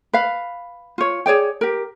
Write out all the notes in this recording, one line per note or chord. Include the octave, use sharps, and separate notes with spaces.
B4 F5
F4 C#5
G#4 C#5 D5 G5
G4 A#4